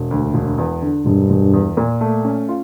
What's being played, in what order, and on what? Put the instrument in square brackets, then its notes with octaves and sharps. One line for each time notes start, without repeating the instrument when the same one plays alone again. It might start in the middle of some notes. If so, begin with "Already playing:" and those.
Already playing: [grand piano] E1
D2
E1
E2
D3
[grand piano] E1 [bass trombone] G2
[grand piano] E1
E2
A#2
A3
C#4
F4